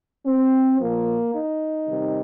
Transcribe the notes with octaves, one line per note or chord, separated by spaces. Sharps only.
C4
A#2 F3 A#3
D#4
C3 D#3 G3